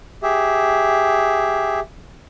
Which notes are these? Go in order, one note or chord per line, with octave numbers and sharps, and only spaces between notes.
G4 G#4 E5